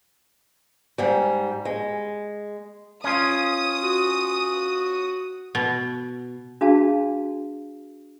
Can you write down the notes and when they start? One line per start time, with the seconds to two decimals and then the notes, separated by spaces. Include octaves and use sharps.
0.98 G#2 G3
1.65 G#3
3.04 C#4 F4 D#6
3.83 F#4
5.55 B2
6.61 D4 F#4 G#4 F5 A5